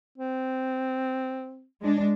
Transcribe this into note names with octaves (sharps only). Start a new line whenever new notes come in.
C4
G#3 D4